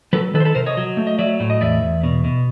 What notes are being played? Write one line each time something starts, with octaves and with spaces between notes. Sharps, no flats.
F#3 A4 B4
D#3 A4 B4
C5
A4 B4
C3 A#4 C5
C#5 D#5
F#3
A3
D#5
F#3 D5 E5
A2
D#5
E2 D5 E5
E2
B2
B2